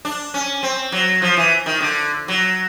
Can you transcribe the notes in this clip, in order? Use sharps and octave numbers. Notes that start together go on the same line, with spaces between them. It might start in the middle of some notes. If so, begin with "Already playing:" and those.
D4
C#4
C4
F#3
F3
E3
D#3
D3
F#3